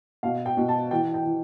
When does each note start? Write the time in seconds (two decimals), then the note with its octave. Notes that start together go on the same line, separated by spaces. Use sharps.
0.23 B2 F5
0.46 G5
0.57 B2
0.68 A5
0.91 E3 G5
1.14 G5
1.25 E3